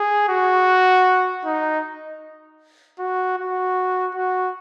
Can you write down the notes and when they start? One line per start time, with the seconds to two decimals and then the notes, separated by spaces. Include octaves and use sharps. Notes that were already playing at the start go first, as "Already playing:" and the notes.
Already playing: G#4
0.29 F#4
1.45 D#4
2.99 F#4
3.38 F#4
4.15 F#4